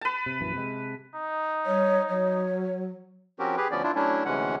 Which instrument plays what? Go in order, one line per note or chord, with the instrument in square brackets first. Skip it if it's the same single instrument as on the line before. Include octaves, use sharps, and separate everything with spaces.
[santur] B4 A5
[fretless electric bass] C3
A#1 F#2 E3
C3 G#3
[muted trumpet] D#4
[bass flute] G3 [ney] C#5
[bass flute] F#3 [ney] C#5
[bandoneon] F3 C4 C#4 F#4 G4 A#4
G4 G#4 B4
D2 F3 B3 C#4 D5
D4 E4 F4
F#3 A3 C#4 D4 E4
D2 C3 E3 G#3 C#4 F#5